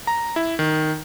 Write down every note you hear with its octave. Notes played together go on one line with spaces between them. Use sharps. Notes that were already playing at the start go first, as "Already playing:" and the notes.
A#5
E4
D#3